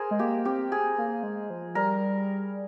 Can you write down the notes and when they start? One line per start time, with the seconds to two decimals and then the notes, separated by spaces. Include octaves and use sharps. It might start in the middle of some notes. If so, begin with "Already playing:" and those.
Already playing: G#4 A#4 C5
0.11 G#3
0.19 A#3 G4
0.45 C4 G4
0.72 G#4
0.98 A#3
1.23 G#3
1.50 F3
1.75 G3 A#4